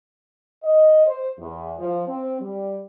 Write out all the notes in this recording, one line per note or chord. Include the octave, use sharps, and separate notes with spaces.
D#5
C5
E2
F3
C4
G3